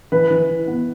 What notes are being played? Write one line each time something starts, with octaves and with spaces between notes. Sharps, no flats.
E3 B4
E3
E4
B3